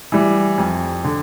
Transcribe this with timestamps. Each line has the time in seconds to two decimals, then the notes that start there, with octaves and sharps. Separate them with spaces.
0.12 E3 G3
0.58 F2
1.04 D3